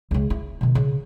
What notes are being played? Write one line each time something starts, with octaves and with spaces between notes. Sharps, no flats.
C#2 C#3
E4
B2 D#3
C#3